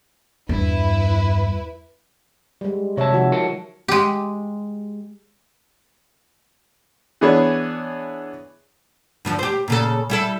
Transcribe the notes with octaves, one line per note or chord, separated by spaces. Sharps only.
E2 G2 E4 B4
G3 G#3
C3 F#3 C#5 E5 A5
D#3 F3 F#4
A#4 F#5 A5
G#3 G4
E3 B3 D4 G#4 C#5
G2 D3 F3
G4 C5
A#2 C#3 A4
G3 E4 A4